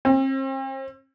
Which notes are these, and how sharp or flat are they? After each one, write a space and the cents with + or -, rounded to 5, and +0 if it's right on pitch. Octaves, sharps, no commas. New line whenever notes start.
C4 +40